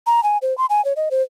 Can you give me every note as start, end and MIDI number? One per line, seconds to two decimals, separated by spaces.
0.07 0.23 82
0.23 0.38 80
0.42 0.56 72
0.58 0.66 84
0.70 0.84 80
0.85 0.93 73
0.96 1.09 75
1.11 1.22 72